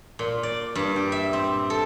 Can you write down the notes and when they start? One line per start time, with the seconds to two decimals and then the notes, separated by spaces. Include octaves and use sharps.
0.19 A#2
0.43 D5
0.75 G2
0.96 G4
1.12 E5
1.33 C4
1.70 A4